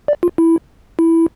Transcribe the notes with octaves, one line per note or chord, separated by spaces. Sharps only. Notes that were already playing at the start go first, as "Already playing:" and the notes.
D5
F4
E4
E4